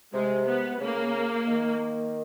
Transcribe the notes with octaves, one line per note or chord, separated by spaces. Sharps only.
C3 G#3
B3
C#3 A#3
D#3